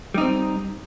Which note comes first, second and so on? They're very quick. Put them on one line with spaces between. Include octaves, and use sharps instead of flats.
G3 D#4 C4